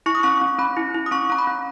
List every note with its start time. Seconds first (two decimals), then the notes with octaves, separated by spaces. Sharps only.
0.06 E4 C#6
0.15 D#6
0.23 C#4 C#6
0.41 C#4
0.58 C#4 B5
0.77 E4
0.94 E4
1.06 D#6
1.11 C#4 C#6
1.30 C#4 A#5
1.38 B5
1.47 C#4